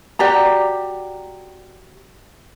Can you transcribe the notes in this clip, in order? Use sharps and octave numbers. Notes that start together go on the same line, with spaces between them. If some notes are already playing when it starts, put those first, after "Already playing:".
F#4 G4 D5 A#5